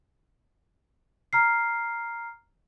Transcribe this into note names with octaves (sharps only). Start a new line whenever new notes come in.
A#5 F6 C7